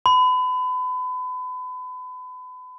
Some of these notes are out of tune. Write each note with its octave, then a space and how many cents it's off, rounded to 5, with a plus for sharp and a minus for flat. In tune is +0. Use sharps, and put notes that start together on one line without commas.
B5 +35